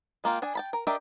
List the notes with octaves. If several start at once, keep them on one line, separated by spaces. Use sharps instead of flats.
G#3 A#3 F4 G5
D4 G#4 G#5
G5 A5 B5
A#4
D4 G4 A#4 D#5 E5